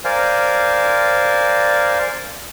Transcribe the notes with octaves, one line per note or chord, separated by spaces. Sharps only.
A#4 C5 D5 F5 G#5